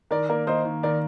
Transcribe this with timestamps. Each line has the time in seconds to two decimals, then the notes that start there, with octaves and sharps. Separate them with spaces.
0.11 D#3 A#4 D5
0.29 A#3 A#4 D5
0.47 A#3 C5 D#5
0.65 D#3
0.83 D#3 A#4 D5